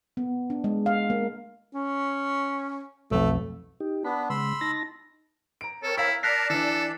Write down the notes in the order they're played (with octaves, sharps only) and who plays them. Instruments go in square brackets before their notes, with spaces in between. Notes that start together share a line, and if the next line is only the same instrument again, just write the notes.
[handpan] B3
D4
G#3
F5
A#3
[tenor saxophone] C#4
[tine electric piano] B1 F2 [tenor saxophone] A3
[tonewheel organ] D#4 G4
[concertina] B3 D4 [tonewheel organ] B5
[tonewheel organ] C#3 G#3 [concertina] B5 C6 E6
[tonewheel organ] D#4 A5 A#6
[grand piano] A#5 D7
[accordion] C4 A#4 C#5 [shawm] A4
[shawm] E4 [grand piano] F5 A#5 E6
[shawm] A#4 [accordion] D5 A5 [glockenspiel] F#6 B6 C7
[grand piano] E3 D4 [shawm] A4